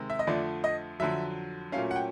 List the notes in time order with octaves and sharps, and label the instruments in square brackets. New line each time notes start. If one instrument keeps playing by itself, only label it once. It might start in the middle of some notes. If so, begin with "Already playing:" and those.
Already playing: [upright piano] C3 D#3 G#3 C4
E5
D#5
F2 D3 F3 A3 D5
D#5
F2 D3 F#3 E5
A#2 F#3 A3 C#4 F5
F#5
G5